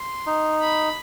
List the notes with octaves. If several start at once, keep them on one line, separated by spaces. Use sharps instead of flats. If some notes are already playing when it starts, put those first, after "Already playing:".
Already playing: C6
D#4
B5